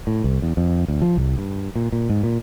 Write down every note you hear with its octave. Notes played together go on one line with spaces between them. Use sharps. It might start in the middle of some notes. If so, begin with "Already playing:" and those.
A2
C2
E2
F2
D2
F3
C2
G2
A#2
A#2
G#2
A#2